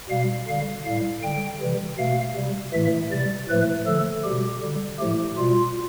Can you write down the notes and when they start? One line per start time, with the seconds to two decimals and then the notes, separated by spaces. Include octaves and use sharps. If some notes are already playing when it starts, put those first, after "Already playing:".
0.10 B2 G3 F5
0.48 D3 G3 F5
0.86 A2 G3 F5
1.23 D3 G3 G5
1.61 C3 E3 G3
1.98 B2 A3 F5
2.36 C3 G3
2.73 A2 E3 A3 E5
3.12 C3 G3 D5
3.49 A2 F3 A3 B4
3.86 D3 F3 A3 A4
4.24 B2 G3 G4
4.62 D3 G3
4.99 A2 F3 A3 G4
5.37 B2 G3 F4